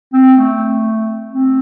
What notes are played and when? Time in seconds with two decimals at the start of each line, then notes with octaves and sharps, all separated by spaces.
0.13 C4
0.38 A3
1.34 C4